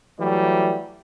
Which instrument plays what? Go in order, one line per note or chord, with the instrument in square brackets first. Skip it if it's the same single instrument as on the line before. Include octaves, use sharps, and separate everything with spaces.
[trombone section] E3 F#3 G3 A3